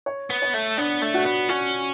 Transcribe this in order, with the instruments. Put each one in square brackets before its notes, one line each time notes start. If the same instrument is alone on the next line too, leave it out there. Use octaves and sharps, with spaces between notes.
[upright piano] C#5
[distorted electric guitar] B3
[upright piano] C#5
[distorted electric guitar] A3
[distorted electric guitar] B3 [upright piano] D4
[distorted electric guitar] A3
[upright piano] F#4
[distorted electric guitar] B3
[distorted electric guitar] C#4 [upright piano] F#4